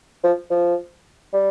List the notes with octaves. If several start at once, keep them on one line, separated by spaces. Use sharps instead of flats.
F3
F3
G3